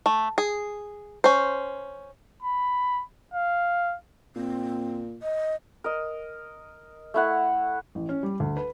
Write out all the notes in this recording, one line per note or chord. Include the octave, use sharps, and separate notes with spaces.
A3
G#4
C#4 C5
B5
F5
A#2 C4
D#5
A#4 D#5
A3 E4 F#5
A1
C#4
G3
D2
B4